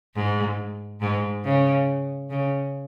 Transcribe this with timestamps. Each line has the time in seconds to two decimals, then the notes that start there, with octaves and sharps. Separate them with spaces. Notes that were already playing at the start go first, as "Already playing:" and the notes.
0.16 G#2
1.01 G#2
1.45 C#3
2.30 C#3